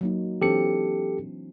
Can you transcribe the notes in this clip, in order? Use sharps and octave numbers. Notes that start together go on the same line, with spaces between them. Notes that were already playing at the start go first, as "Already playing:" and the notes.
F#3 A#3 D#4
E3 C4 D4 G4 A4 C#7